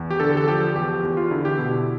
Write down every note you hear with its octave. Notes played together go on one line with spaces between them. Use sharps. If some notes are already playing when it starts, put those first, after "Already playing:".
Already playing: E2
G4
D3 A4
A4
F3 G4
E2 G4
E2
F4
D3 E4
G4
B2 E4